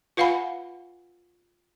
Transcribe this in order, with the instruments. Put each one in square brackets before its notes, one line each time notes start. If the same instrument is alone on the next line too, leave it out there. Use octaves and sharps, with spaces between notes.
[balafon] F4 B4 F5 F#5 G#5 B5